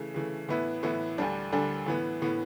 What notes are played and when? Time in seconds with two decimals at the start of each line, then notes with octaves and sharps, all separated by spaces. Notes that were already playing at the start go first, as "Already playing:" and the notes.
Already playing: C#3 E3 A3
0.14 C#3 E3 A3
0.49 A2 E3 B3 E4
0.83 A2 E3 B3 E4
1.18 D2 D3 G3 D4
1.52 D2 D3 G3 D4
1.86 A2 E3 B3
2.22 A2 E3 B3